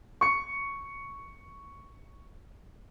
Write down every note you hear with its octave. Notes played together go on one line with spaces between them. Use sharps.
C#6 C#7